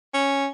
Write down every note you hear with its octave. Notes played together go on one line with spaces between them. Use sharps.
C#4